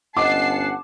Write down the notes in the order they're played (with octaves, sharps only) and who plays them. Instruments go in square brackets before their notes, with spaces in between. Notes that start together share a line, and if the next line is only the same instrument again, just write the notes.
[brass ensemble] G1 C#4 F#5 [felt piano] D#5 [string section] A5 C7 [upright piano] D6